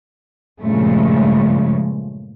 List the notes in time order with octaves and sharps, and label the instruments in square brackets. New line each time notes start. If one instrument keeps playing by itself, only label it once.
[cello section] G2 A#2 C#3 F3 G#3 A3